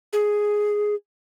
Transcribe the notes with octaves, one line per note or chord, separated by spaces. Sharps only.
G#4